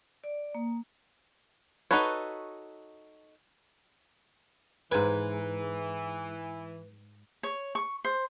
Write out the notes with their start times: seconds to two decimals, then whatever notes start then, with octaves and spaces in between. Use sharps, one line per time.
0.24 D5
0.55 A#3
1.91 D#4 F#4 A4 B4 C#5
4.92 G#2 E3 B4 G#5
7.43 C#5
7.75 C#6
8.05 C5